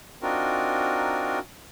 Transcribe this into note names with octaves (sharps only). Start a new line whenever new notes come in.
C4 D4 D#4 F4 F#4 A#4